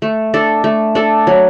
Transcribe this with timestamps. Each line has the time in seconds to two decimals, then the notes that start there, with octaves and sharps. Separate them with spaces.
0.02 A3
0.34 D4 A4
0.64 A3
0.95 D4 A4
1.27 F#3